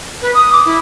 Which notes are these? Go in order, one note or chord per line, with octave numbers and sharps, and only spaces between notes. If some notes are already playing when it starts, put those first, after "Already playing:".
B4
D#6
D6
E4